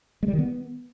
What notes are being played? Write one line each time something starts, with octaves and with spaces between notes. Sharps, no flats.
G#3
G3
D#3
B3